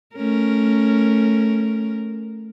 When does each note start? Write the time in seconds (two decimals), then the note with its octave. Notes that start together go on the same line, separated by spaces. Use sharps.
0.16 A3 C#4 A#4